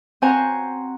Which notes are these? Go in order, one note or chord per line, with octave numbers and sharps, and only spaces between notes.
C4 F#4 C5 F#5 G#5 A#5